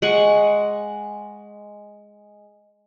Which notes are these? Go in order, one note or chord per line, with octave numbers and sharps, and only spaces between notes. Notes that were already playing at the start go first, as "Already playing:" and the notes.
G#3 F#5 C#6